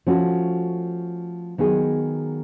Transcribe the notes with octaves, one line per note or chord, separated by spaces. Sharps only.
F3 A3 C#4 F#4
D#3 F#3 B3 D#4 G#4